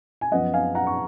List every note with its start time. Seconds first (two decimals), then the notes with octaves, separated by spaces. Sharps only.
0.21 G#5
0.31 F#2 F3 B3 D#5 F#5
0.53 F5 G#5
0.75 F#5 A#5
0.87 C#6